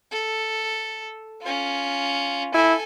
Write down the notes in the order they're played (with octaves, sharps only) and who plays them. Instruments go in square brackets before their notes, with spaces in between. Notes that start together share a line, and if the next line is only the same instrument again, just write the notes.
[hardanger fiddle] A4
C#4 F4
[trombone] E4 [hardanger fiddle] A4 G#5